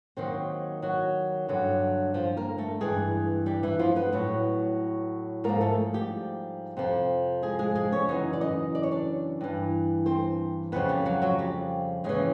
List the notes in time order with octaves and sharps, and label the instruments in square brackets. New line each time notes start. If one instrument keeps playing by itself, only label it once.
[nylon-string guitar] D#2 D#3 F#3 C4 C5
F#3 F#4
G2 D3 F#3
F3 F4
A#3 A#4
A3 A4
G2 E3 G#3 G#4
G3 G4
E3 E4
F3 F4
B3 B4
A2 F#3
G#2 F3 A#3 A#4
A3 A4
G3 G4
F2 C3 F3
G#3 G#4
G#3 G#4
G#3 G#4
C#4 C#5
F#2 C#3 E3 D#4 D#5
D5
D#4 D#5
D5
C#5
D4 D5
G2 E3
C4 C5
F2 C#3 F3 B3 B4
G3 G4
F#3 F#4
F#3 F#4
G3 G4
D#2 C#3 E3 G#3 G#4